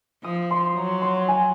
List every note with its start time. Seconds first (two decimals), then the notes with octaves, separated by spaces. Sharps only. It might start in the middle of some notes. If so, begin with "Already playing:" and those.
0.24 F3 D#6
0.51 C6
0.76 F#3 A#5
1.02 C6
1.28 G#5